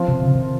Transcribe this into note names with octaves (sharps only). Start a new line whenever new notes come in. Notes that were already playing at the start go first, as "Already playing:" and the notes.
Already playing: F3 C4 F4
C3
C#3
C3 D#3